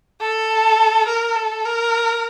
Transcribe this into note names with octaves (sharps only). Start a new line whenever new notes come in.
A4
A#4
A4
A#4